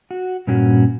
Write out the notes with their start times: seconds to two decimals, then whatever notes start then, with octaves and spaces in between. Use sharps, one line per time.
0.11 F#4
0.47 G2 A#2 C#4 F#4